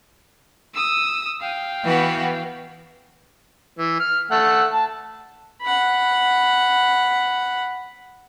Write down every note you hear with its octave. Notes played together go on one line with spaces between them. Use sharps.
D#6 E6
F5 G5
E3 B3 F#4
E3
F6
A3 F#5 E6
A5
F#5 B5